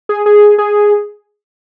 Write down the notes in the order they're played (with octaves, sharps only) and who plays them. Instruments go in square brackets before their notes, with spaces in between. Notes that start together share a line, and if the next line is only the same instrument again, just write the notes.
[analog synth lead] G#4
G#4
G#4